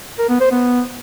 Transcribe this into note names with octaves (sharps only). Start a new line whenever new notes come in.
A#4
B3
C5
B3